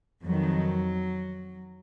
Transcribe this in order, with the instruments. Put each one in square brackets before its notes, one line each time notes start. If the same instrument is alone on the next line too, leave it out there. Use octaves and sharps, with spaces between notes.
[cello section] F2 D#3 F#3